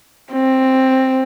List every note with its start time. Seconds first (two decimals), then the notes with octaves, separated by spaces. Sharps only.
0.33 C4